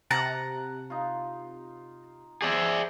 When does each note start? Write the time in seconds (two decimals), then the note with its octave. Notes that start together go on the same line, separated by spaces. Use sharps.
0.11 C3 F#5 A5 A#5
0.90 D#4 F4
2.42 G#4 C5 D5 E5